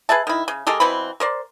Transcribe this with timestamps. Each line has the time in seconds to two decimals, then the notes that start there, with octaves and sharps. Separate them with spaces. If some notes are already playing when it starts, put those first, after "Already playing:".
0.09 G#4 B4 E5 A5
0.27 D#3 E4
0.48 C#3
0.67 G#3 G4 A4 A#4
0.80 B2 E3 C4 B5
1.20 A#4 C5 D5